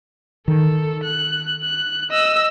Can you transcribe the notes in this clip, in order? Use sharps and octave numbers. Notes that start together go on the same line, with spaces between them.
D#3 A4
F#6
F#6
D#5 E6